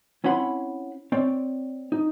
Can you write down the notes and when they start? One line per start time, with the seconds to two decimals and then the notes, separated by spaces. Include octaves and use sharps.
0.24 C4 C#4 E4 F#5 B5 C6
1.12 C4 C#5 D5
1.92 D#4